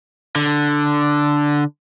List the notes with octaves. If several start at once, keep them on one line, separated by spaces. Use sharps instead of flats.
D3